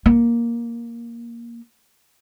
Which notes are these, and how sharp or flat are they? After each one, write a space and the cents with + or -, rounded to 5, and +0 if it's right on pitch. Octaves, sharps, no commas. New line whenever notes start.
A#3 +5